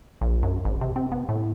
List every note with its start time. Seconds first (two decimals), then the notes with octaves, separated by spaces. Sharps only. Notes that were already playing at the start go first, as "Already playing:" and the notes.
0.21 A#1
0.43 F#2
0.65 G#1
0.81 C3
0.96 C4
1.12 B3
1.29 A2